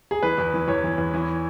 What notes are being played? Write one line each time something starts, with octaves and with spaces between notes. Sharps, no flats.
G#4
E3 B4
E2
E3
E2 C#5
E3
E2
E3